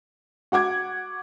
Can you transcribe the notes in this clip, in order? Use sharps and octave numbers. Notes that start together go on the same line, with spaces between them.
F#4 F#5 D6 G#6